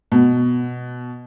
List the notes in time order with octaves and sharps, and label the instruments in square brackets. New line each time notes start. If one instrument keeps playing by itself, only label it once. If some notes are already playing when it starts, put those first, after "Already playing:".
[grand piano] B2